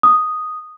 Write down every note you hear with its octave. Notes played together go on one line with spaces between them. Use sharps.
D#6